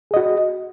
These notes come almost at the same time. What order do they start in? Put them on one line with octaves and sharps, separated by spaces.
G#4 D#5 F#4